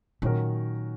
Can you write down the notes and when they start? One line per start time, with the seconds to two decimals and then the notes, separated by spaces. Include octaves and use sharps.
0.22 A#2 D#3 F#3 C#4 F#4 A#4